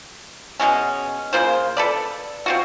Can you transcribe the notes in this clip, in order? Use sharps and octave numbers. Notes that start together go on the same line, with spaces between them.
B2 G#3 C#4
C#3 A#3 F4 C5
A4 B4 D5
C4 F4 F#4